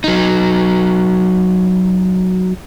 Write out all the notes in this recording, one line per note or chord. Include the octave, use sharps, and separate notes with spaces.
F#3 D#4